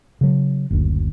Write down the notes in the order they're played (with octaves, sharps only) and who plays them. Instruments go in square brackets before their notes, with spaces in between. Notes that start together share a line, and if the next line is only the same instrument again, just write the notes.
[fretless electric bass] C#3 F#3
F#1 D2